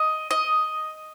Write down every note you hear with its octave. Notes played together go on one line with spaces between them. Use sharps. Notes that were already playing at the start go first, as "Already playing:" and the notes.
Already playing: D#5
D#5